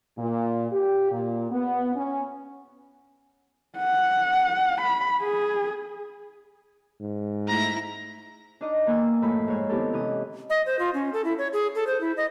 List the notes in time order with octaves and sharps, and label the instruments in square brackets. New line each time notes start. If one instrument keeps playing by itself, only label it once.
[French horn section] A#2
G4
A#2
B3
C#4
[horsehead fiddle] F#5
B5
G#4
[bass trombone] G#2
[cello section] A3 E4 [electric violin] A#5 A#6
[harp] D4 D#4 D#5 D6
E2 A#3 G5 G#5 D#6 E6
F#2 A2 F3 A3 B5
G#2 C#5 G#5
D#3 B3 C4 E4 G4 A4
C3 E3 C#4 D#5 D#6
[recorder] D#5
C5
F4
C#4
A4
E4
C#5
G#4
A4
C5
E4
D#5